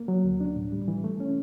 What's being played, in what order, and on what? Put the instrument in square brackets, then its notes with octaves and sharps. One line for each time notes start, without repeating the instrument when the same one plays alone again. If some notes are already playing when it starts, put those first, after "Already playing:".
Already playing: [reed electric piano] A#3
F#3
D2
D4
A2
G3
E3
A3
C#4